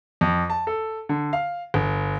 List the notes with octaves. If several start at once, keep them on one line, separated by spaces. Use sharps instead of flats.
F2
A5
A4
D3
F5
G1